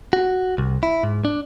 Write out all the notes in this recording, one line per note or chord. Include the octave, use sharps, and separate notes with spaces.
F#4
C2
E4
G#2
D4